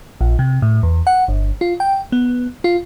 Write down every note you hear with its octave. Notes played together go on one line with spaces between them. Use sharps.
A#1
C3
A2
E2
F#5
G1
F4
G5
B3
F4